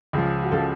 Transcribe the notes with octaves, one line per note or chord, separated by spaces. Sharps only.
C#2 C#3 F3
F#4
C#3 F3 A4